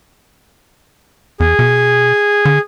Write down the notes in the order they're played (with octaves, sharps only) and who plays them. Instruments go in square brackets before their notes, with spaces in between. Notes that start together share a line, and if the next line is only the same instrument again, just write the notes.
[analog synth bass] E2 [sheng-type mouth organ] G#4
[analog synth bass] B2
D3